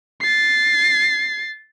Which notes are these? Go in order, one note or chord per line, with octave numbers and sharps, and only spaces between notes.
A6 C7